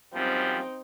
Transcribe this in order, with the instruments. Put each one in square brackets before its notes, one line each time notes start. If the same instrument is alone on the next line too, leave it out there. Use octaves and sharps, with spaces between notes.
[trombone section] F#2 F3 G3 [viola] C4 D#4